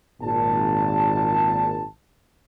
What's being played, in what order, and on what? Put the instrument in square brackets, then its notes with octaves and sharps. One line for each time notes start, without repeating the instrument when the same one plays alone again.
[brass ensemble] G#1 A#2 A5